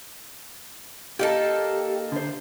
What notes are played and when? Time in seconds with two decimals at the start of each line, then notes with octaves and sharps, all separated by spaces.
1.19 A#3 D#4 G4 A4
2.12 D3 C5